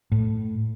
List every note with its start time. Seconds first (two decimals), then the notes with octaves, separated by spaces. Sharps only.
0.12 A2